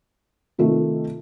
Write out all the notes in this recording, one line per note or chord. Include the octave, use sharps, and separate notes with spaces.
C3 D#3 A3 F4